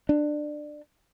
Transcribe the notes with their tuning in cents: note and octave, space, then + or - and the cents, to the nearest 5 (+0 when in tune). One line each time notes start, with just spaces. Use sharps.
D4 +20